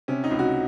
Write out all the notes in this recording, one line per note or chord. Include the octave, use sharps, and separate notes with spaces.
C3 C#4
D#4
C#2
F#4